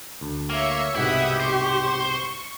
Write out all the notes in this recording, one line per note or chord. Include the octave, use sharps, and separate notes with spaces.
D2
A#3 C#5 E5 C#7
C2 G#2 B2 E4 G4 E5 F#5 D#6
C5 C#6